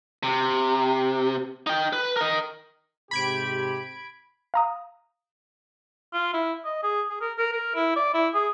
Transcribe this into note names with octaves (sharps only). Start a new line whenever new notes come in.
C3
D#4 G5
B4
A#4 D#5
G#2 C3 G4 B5 G#6 D7
F5 A#5 D#6
F4
E4
D#5
G#4
G#4
A#4
A#4
A#4
E4
D5
E4
G#4